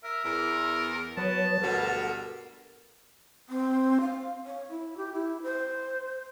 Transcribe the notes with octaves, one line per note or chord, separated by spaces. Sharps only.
A#4 E5
E2 A#4
F#3 B3 B4 C#5 A5
D2 G2 B2 A4 A#4 F#5
C4
F5
C#5
E4
G4
E4
C5